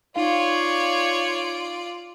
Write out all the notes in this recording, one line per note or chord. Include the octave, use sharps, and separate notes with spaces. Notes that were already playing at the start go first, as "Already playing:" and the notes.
D#4 F4 C#5 D5 F5